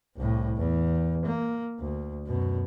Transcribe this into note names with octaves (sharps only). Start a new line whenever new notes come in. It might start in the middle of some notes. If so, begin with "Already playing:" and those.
C2 A2
E2
A#3
D2
F#2 B2